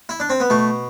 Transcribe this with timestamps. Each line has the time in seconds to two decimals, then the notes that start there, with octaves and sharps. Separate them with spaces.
0.09 E4
0.20 D4
0.30 C4
0.40 B3
0.50 B2 A3